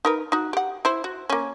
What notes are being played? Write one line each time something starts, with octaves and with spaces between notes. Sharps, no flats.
D#4 A#4 B4
D#4 F#4
G4 F#5
E4 C5
F#4
A#3 C#4